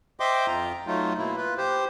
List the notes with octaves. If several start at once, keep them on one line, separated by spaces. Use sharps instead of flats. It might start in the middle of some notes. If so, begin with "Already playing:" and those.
C5 D#5 E5 G5 C6 D6
F2 F4 A#5
F#3 A3 D#4 F4
B2 A#3 E4
F4 B4
G4 C5